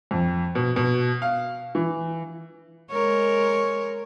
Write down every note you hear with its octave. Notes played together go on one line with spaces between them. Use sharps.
F2
B2
B2
F5
E3
G#3 A#4 C#5